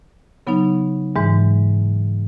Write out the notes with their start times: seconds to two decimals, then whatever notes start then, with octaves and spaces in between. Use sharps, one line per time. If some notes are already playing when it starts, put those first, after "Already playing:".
0.47 C#3 F#3 B3 D#4
1.16 G#2 E3 G#3